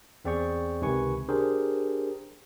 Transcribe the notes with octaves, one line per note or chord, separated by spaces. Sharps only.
E2 C4 G#4 D5 G5 C#6
C#2 C3 D#3 B4 G#5 C#6
D4 G4 G#4 A#4 C5